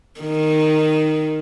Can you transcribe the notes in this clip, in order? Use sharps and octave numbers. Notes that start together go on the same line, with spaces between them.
D#3